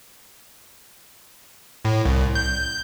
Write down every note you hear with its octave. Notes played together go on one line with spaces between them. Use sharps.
A2
C2
G6